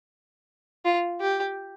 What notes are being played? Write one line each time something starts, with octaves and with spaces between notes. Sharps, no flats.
F4
G4